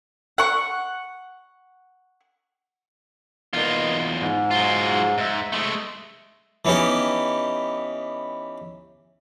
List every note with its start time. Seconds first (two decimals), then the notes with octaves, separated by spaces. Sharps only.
0.38 F#5 C#6
3.53 E2 A#3 B3 D#4 F4
4.21 G#2
4.51 F#3 F4
5.18 G#2 E5
5.52 G#3 A3
6.65 E3 B3 C#4 D#4 G4